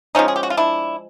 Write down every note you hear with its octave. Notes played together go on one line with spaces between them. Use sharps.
D3 F3 G#3 C#4 D#4
G#4
G4
F#4
F4
D4 E4